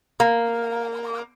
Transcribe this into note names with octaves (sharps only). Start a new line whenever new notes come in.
A#3